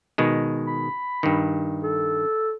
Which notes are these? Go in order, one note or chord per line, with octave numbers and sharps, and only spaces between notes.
B2 D#3 G#3
B5
G2 D#3
A4